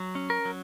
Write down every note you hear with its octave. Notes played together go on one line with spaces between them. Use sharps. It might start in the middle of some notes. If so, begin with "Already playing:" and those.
Already playing: F#3
C#4
A#4
F#3